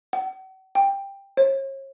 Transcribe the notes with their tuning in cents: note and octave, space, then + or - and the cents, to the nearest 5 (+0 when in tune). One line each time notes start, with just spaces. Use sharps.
F#5 +45
G5 +10
C#5 -40